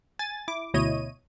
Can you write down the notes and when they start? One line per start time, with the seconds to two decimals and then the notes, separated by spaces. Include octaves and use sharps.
0.19 G#5 A6
0.48 E4 D6
0.74 D2 B2 E4 C#5 D#5 D#7